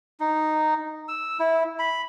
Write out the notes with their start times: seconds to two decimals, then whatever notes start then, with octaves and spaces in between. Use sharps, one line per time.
0.20 D#4
1.08 E6
1.40 E4
1.79 B5